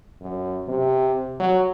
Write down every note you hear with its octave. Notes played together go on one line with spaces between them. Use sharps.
F#2
C3
F#3